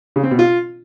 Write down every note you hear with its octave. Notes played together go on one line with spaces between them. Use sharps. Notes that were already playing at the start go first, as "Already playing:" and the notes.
C#3
C4
B2
F4